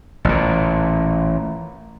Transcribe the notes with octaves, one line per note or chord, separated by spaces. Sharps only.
A1 A#2